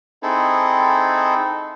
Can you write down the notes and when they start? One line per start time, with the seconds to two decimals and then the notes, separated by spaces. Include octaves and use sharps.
0.23 C4 D#4 E4 G#4 A4